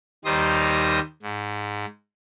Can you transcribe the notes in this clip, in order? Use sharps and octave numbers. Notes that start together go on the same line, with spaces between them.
D#2 D#3 G3 D#4 C5 D#6
G#2